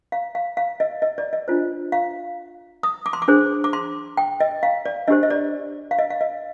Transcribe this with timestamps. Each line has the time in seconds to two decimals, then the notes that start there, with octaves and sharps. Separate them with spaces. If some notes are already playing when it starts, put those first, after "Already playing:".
0.12 F5
0.35 F5
0.57 F5
0.80 D#5
1.02 D#5
1.18 D5
1.33 D#5
1.48 D4 F4 C5
1.92 F5
2.83 D#6
3.06 D6
3.13 C6
3.22 D6
3.28 D4 G#4 C5
3.64 D6
3.73 C6
4.17 G5
4.40 D#5
4.63 F5
4.86 D5
5.08 D4 G4 C5 D#5
5.23 D#5
5.30 D5
5.91 F5
5.99 D#5
6.10 F5
6.21 D#5